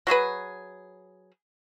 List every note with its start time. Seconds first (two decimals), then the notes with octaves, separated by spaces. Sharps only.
0.07 F#3 F#4 G#4 B4